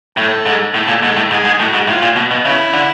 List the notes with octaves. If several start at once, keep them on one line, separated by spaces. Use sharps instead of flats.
A2 A4
G#2
A2 A4
A#2
G#2 A4
A2
G#2 G#4
G#2
A2 F#4
G#2
A2 F4
A#2
B2
B2
C#3 E4
D3